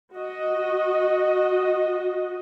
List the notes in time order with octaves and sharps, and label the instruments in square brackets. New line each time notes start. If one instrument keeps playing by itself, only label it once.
[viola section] F#4 D#5